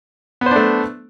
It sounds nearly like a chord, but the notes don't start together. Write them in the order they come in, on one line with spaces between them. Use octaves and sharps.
B3 C5 D4 A3